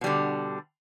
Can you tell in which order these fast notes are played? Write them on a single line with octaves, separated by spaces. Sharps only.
B2 G3 D3